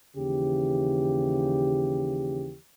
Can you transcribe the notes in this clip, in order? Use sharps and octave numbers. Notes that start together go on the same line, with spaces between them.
D#2 C#3 E3 G4